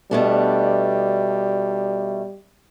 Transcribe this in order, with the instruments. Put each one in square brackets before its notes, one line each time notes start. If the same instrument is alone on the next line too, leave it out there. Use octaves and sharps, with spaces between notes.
[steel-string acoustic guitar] B2 A3 D4 [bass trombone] G3